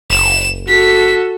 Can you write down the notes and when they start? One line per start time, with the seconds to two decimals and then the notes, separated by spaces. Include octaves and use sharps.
0.10 F#1 E7
0.68 F#4 A4 B6